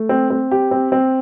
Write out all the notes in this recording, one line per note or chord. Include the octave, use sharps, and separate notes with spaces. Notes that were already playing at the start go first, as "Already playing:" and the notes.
Already playing: A3
C4
C4
G4
C4
C4